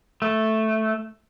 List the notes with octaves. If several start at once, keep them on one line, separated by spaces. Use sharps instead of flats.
A3